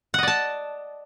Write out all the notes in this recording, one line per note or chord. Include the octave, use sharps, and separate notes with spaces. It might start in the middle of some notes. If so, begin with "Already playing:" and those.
D5 D#5 F#5 A5